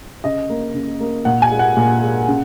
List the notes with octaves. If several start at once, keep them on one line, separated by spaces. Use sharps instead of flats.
C#3 D#5
A#3
C#3
A#3
A#2 F#5
G#5
G#3
F#5
A#2
G#3
C#3